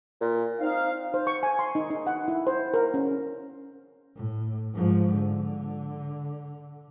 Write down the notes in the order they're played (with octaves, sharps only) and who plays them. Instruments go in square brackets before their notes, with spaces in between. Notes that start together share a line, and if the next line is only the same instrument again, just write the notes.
[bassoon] A#2
[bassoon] C4 [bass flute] D#4 [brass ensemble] F5
[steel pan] C5
C#6
G#5
C6
D#4
D#4
F#5
E4
C5
A#4
C#4
[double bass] A2
G#2 F3
D3